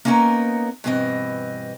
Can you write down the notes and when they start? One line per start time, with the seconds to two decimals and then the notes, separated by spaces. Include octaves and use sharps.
0.05 A#3 B3 C#4 D#4 A#4
0.84 G2 B2 E3 C4 D#5